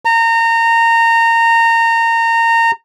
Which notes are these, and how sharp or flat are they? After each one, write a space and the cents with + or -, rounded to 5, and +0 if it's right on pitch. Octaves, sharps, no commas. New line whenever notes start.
A#5 -25